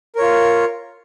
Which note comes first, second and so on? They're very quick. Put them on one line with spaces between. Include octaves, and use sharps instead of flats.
A#4 C#5 F4